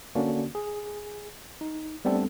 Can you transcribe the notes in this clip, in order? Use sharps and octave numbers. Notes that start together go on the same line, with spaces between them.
D3 A#3 C#4 D4 F#4
G#4
D#4
G3 A3 B3 C4 D4 A4